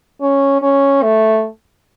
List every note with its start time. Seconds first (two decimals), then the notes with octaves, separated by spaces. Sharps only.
0.21 C#4
0.62 C#4
1.03 A3